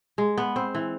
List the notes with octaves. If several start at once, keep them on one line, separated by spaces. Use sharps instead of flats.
G#3
B3
C4
E3